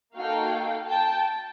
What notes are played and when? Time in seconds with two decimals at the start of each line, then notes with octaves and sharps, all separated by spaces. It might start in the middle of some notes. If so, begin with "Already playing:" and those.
0.16 A#3 D#4 F#4 A4 F5 G5
0.90 G5 A5